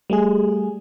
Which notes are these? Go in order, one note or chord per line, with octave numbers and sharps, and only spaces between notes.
G3 A3 G#4